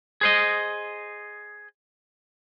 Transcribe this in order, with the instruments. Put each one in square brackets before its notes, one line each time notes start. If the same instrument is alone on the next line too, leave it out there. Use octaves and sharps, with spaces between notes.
[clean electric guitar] G#4 C5 D#5